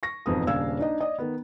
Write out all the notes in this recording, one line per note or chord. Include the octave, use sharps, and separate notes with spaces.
C#6 A#6
E1 F2 G#2 B4 D#6
D#1 C#3 D4 F5 E6 G#6
D4 D#4 D#5
D5 D#5 D#6
D#3 B3